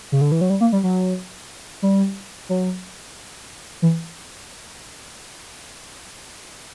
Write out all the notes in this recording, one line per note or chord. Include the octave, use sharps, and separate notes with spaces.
C#3
D3
E3
F#3
G3
A#3
G3
F#3
G3
F#3
E3